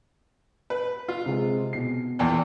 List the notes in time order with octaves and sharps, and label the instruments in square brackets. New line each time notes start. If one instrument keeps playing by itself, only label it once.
[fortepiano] B4
F4
[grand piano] C3 G#3
B2 C7
[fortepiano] E2 A#2 G5